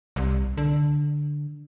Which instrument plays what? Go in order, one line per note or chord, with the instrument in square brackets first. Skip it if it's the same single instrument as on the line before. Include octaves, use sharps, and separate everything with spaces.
[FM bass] C2
D3